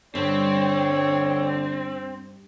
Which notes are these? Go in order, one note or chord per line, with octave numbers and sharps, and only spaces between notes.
G2 D3 C4 C#5